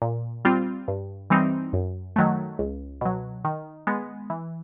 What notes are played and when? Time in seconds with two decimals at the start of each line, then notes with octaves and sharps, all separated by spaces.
0.02 A#2
0.45 G3 C4 F4
0.88 G2
1.30 E3 G3 C4 D#4
1.73 F#2
2.16 D#3 F#3 A3
2.59 C#2
3.01 B2 F#3
3.45 D#3
3.87 G#3 B3
4.30 E3